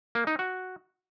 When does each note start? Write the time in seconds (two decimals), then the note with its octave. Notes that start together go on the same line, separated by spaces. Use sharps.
0.15 A#3
0.27 D#4
0.39 F#4